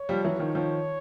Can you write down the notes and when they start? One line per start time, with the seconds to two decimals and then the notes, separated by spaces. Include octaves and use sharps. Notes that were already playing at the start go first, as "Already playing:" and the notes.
Already playing: C#5
0.09 F3 G3
0.24 E3 F#3
0.39 D#3 F3
0.55 D#3 F3